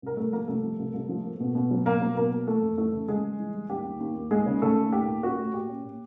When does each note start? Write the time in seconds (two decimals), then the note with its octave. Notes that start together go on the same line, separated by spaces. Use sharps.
0.02 C2 A#4
0.17 C2 A3 A4
0.32 F3 A#3 A#4
0.48 C2 A3 A4
0.63 F3
0.79 C2
0.94 C2
1.09 F3
1.25 A#3
1.40 B2
1.55 B2
1.71 F#3
1.85 B2 A#3 A#4
2.01 F#3
2.17 B2 A#3 A#4
2.32 A#3
2.47 E3 A3 A4
2.62 F2
2.78 E3 A3 A4
2.93 C#3
3.08 C#3 G#3 G#4
3.24 G3
3.40 E3
3.54 G3
3.70 D#2 G4
3.85 D#2
4.00 D#2
4.16 D#2
4.31 D#2 G#3 G#4
4.46 C#3
4.62 C#3 A3 A4
4.77 D#2
4.92 A3 G4
5.07 A#2
5.23 C#4 F#4
5.38 A3
5.54 A#2 G4
5.69 C#4
5.84 A#2